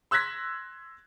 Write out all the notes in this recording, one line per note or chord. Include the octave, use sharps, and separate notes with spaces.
C6 E6 F#6 G#6 A#6 B6